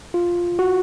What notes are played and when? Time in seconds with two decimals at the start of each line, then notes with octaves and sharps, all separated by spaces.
0.14 F4
0.59 F#4